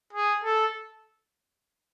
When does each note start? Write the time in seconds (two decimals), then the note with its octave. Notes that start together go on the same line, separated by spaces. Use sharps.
0.13 G#4
0.44 A4